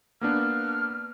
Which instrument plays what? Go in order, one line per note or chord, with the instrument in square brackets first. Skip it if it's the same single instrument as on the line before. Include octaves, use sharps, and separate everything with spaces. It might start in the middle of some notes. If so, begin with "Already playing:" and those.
[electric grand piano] A#3 B3 D4 [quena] F6